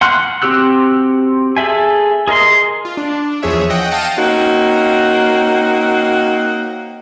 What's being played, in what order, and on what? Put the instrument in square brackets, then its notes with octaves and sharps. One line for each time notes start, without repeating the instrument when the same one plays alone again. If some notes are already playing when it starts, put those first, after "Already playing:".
[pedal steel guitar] F#5 C6 F6 F#6
C4 F#4 G4 E6 F#6
G#4 A4 E5 G#5
G#4 A#4 D#5 C6
[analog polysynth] F4
D4
E2 F3 G#4 C#5 E5
D#5 F#5 G5
F5 G5 A5 A#6 C#7 D#7
[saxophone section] A#3 C4 C#4 D#4 F#4